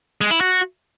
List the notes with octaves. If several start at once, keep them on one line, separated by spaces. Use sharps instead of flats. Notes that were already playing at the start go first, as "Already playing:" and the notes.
G#3
E4
F#4